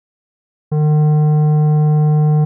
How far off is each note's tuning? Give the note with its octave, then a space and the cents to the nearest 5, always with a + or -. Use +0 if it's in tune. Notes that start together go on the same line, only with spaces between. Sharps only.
D#3 -45